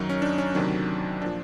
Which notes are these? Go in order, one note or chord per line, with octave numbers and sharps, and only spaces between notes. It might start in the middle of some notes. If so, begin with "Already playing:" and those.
Already playing: F#2 D#3 F#3 D#4
C#4
D4
C#4
D2 C3 D#3 F#3 D4
A#2 F3 D4